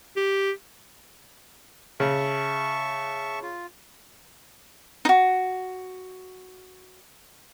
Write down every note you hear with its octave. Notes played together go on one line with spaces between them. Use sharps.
G4
C#3 E5 A5 C#6
F4
D#4 F#4